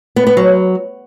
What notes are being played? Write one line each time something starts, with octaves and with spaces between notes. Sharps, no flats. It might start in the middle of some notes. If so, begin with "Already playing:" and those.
B3
B3
F#3